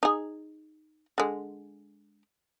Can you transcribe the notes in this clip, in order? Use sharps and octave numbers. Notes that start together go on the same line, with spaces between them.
D#4 G#4
D3 G#3